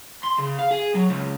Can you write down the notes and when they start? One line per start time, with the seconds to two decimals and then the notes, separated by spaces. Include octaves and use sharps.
0.24 C6
0.39 C#3
0.59 F5
0.71 G#4
0.95 F#3
1.09 C#2